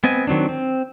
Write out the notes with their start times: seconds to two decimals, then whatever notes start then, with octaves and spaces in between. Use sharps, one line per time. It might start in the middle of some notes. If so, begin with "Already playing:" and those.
0.04 B3 C4 D#5 G#5
0.27 D#3 F#3 C4 D4
0.49 C4